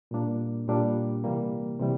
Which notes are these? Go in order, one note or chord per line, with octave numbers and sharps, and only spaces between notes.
A#2 G3 A#3 D4
A#2 G3 A#3 D4
C3 E3 G3 A#3
C3 E3 G3